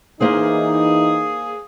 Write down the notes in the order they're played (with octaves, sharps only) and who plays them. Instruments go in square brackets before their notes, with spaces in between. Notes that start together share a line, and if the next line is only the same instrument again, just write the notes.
[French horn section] E3 D#4 [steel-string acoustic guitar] A#3 C5 F5 [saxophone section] G#4